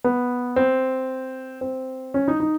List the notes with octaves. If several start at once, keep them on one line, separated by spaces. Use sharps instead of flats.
B3
C4
C4
C#4
D#4
D#4